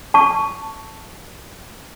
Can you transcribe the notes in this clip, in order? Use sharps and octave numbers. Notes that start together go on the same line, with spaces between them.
A5 C#6